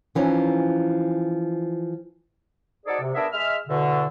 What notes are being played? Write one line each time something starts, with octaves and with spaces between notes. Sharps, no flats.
E3 F3 C#4 D#4
D#4 F#4 G#4 A4 C5 D5
C3
B3 D4 G#4 A#4 E5
G#3 E5 F6
E2 B2 D3